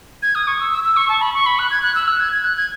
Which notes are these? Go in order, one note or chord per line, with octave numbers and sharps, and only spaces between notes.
G#6
D#6
C#6
E6
E6
E6
C#6
A5
B5
C#6
B5
F#6
G#6
F#6
E6
F#6
G#6
G#6
F#6
G#6